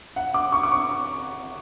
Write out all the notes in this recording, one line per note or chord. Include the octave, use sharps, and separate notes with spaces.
F#5
D6
C#6
D6
C#6